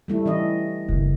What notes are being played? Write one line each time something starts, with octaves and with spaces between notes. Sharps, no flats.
G3 A3 E4
E3 C#4 D#5
F#1